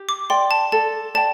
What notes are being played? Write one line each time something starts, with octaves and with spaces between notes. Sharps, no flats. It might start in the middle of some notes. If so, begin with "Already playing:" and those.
Already playing: G4
D6
D5 G5 C6
A5
A4 A5
D5 G5 A5